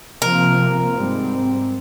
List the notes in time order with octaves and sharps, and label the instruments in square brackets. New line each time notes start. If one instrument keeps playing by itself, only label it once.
[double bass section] C3 F3 A#3 [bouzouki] A#4
[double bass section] G#2 G3 C4